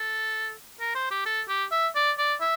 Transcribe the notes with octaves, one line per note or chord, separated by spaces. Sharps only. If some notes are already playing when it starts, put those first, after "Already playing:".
Already playing: A4
A#4
C5
G4
A4
G4
E5
D5
D5
E5